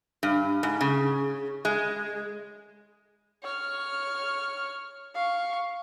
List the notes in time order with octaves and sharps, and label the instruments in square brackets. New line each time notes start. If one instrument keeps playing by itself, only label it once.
[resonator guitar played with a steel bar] G2
G#2
C#3
G#3
[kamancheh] C#5 F6
F5 C#6